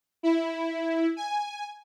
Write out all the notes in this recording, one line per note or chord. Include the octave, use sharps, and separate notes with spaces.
E4
G#5